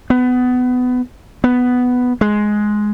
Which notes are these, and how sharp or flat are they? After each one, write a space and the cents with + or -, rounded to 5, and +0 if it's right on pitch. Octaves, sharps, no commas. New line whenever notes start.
B3 +20
B3 +5
G#3 +10